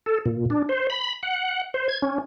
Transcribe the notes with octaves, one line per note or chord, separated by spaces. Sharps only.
A4
A#2
D4
C5
B5
F#5
C5
G#6
C#4